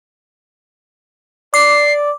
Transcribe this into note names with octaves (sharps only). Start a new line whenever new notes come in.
D5 D6 C7